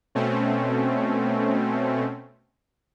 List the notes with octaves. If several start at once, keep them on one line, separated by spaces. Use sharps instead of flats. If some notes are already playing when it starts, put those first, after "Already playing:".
B2 A3 C4 C#4